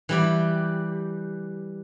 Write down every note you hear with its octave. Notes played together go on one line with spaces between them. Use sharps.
E3 G3 G4